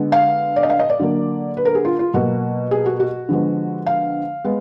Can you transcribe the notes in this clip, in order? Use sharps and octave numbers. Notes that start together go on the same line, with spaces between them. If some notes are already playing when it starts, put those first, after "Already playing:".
Already playing: D3 G#3 B3
F5
D5
D#5
F5
D#5
D5
D3 F#3 A#3
B4
A#4
G#4
F4
F4
B2 F#3 A#3 F#4
G#4
F#4
F#4
D3 F3 G#3 B3
F5
G#3 B3